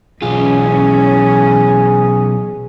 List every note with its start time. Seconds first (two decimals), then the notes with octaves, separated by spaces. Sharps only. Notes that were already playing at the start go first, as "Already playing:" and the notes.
0.22 B1 E3 C#4 F4 G#4